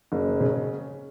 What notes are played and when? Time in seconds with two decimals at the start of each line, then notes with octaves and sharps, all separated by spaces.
0.12 F#1
0.41 C#3